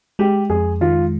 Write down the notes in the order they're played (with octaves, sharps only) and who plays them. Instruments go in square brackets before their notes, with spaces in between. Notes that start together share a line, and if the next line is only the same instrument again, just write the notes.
[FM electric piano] G#3 [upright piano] G4
[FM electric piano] F2 [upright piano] G#4
[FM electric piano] D#3 [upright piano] F4